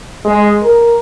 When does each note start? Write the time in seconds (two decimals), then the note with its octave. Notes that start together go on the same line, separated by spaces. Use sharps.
0.24 G#3
0.62 A#4